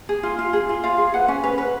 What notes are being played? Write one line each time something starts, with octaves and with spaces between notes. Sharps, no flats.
G#4
F4
F4
G#4
F4
F4 F5
G#4
B4 F#5
C#4 G#5
B4
B4